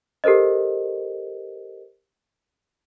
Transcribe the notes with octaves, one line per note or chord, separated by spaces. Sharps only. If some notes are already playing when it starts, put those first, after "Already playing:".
G4 A4 A#4 C5 D#5